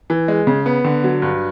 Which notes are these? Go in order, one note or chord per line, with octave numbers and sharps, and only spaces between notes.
E3
G#3
C#3
B3
D3
F#3
G2